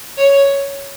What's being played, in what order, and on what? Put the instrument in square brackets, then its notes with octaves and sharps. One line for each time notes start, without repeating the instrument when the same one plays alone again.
[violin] C#5